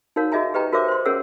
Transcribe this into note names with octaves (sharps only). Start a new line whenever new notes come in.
D#4 F#4 A#4 C#5 F5
F#4 G#4 D#5 E5 G#5 A#5
G4 B4 D#5 G5 A#5
F#4 A#4 C5 C#5 E5 D6
C5 C6
C#4 G#4 A#4 C#5 F#5 E6